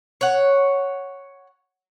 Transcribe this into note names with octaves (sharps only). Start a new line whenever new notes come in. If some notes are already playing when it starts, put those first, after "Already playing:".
C#5 F#5